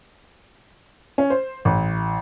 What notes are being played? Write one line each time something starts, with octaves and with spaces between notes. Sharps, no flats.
C#4
C5
A1